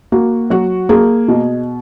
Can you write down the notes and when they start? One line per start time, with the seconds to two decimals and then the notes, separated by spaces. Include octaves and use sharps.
0.12 A#3 F#4
0.50 F#3 F#4
0.89 A#3 G#4
1.28 B2